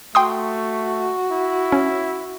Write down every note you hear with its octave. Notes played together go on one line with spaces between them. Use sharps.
A3 F#4 G5 C6 D#6
E4
C#4